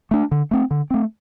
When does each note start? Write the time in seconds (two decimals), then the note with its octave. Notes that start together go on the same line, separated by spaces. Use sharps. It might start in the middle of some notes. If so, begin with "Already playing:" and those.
0.11 A3 D4
0.31 D3
0.51 A3 C4
0.71 D3
0.90 A3 C4